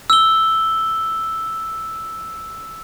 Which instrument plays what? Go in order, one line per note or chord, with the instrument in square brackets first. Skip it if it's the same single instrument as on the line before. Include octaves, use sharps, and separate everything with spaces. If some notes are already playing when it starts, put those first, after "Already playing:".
[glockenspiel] E6 G7